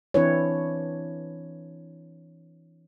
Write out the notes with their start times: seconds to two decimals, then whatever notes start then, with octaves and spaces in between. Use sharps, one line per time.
0.14 E3 C4 D4 E4 B4 C#5